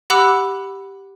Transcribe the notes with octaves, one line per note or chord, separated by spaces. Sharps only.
G4 F#5 B5 D6 E6 F#6